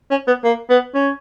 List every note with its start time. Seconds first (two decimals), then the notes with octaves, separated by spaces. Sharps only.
0.11 C#4
0.27 B3
0.44 A#3
0.69 B3
0.94 C#4